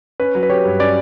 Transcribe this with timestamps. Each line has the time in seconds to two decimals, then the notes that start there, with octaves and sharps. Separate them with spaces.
0.20 C#4 B4
0.35 F#3
0.43 B4
0.50 G4 C#5
0.65 G2
0.80 C#4 D5